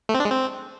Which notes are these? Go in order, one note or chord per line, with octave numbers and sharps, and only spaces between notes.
A3
C4
D4
G#3
C4